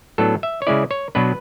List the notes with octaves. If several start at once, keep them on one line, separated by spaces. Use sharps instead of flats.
A2 F#3 B3 D4 A4
E5
C#5
C#3 G#3 C#4 E4 D5
C#5
B2 F#3 B3 D4 B4